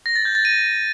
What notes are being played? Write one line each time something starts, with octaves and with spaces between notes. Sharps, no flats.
A#6
A6
G6
A6
D#7